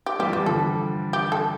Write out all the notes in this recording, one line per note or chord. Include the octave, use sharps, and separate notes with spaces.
G4
E3 G3 G4
F3
E3 G3 G4
D3 F3 A4
G4
A4